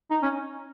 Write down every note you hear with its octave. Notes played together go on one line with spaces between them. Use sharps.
D#4
C#4